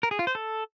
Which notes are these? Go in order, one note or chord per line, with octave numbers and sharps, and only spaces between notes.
A#4
G#4
F4
C5
A4